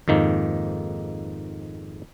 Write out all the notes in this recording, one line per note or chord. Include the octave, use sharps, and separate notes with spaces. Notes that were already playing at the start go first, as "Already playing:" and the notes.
F2 G#2 D#3 A#3